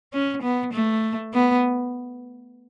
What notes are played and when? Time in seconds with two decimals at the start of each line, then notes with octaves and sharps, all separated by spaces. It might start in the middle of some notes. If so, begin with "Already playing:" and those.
0.13 C#4
0.43 B3
0.73 A3
1.34 B3